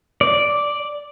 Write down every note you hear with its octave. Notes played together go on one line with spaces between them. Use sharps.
D5